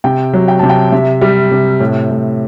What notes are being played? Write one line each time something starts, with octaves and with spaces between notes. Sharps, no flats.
C3 G5
F#3
G5
C3 A5
G5
C3 E5
G3
C3
A2
A2